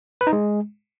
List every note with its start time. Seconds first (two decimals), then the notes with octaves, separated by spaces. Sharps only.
0.21 B4
0.27 D#4
0.33 G#3